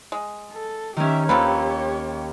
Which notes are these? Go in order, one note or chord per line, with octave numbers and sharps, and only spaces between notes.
G#3
A4
D#3 C#4 G4 E5
D#2 F3 C4 G4 B4 C#5